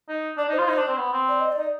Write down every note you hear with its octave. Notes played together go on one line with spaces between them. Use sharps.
D#4
D4 D5
D#4
C5
F4
D#4 C5
D4
C4
B3
C4
D5
D#5
D5
D#4